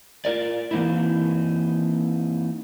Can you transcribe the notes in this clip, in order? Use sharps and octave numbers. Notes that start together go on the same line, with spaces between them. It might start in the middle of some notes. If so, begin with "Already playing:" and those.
F4 A#4 D5
E3 A#3 C4 D#4 E4